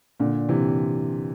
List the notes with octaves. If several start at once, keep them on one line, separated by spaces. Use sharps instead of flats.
A#2 D3
C3 E3